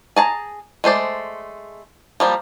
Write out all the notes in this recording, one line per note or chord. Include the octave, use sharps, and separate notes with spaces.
G#4 A5 A#5
G#3 A3 C5 D5
F3 G3 A#3